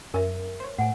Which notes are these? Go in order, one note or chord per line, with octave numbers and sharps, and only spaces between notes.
F#2 C#4 A#4 E5
C5 C#5
A2 F#5 G#5